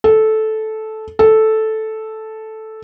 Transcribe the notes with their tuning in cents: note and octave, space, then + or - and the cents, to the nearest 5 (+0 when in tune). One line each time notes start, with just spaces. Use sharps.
A4 -10
A4 -5